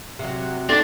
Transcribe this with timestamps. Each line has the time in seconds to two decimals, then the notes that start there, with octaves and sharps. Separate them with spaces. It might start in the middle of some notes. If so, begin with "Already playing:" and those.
0.19 C3 F#3
0.69 A3 C4 D4 D#4 D5